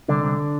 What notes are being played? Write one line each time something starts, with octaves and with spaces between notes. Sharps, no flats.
C2 D3 D4
C2